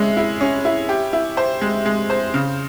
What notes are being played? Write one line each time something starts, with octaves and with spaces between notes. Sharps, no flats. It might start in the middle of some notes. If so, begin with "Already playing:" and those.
Already playing: G#3 C#4 E4
E4
C#4
E4
G4
E4
C5
G#3
G#3
C5
C#3